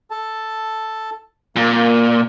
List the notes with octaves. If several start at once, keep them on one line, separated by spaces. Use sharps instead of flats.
A4 A5
A#2 A#3